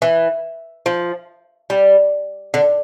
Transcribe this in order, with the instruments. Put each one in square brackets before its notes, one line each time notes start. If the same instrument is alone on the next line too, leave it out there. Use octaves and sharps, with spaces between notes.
[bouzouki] E3
F3
G3
D3